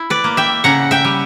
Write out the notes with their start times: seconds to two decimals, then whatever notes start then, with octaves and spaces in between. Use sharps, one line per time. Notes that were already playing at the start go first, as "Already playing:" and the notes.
Already playing: E4
0.10 B4 D5
0.24 A#3
0.37 E5 G5
0.64 C#3 F#5 A#5
0.91 E5 G5
1.05 G3